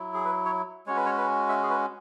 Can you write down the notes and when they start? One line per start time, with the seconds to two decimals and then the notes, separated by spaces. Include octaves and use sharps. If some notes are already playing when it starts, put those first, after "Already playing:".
Already playing: F#3 E4
0.14 G#4
0.25 B4
0.45 C#5
0.87 G#3 C#4 F#4 C#5
0.96 B4
1.06 C#5
1.18 B4
1.49 E5
1.63 G#4
1.70 B4